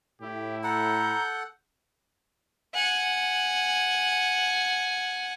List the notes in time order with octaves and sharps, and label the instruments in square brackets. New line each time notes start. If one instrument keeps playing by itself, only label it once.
[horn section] A2 E4 [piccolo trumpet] G4
[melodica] A4 F#5 [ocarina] A#5 [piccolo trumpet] G6
[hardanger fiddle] F#5 G#5